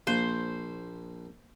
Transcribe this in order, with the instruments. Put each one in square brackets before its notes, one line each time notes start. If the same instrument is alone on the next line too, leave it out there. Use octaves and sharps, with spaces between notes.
[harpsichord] A#1 [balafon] A#3 [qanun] C5